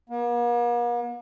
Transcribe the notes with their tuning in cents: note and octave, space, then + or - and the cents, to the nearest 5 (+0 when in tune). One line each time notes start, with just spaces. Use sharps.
A#3 +45